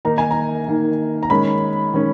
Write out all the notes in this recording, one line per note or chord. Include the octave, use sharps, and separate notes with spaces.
D#3 A#3 D#4 A#5
G#5
A#5
D#3 A#3 D#4
A#5
D#3 G#3 C#4 B5
D#3 G#3 C#4